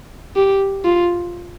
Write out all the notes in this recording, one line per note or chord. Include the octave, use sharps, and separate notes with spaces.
G4
F4